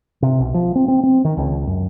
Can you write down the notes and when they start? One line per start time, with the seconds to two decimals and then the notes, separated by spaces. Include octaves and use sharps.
0.22 C3
0.40 B1
0.54 F3
0.75 C4
0.88 C4
1.03 C4
1.25 D#3
1.37 C#2
1.67 F#2